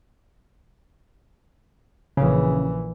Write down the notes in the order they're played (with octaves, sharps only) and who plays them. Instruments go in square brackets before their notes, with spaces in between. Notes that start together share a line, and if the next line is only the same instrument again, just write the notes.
[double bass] A#1 E3 [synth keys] C#3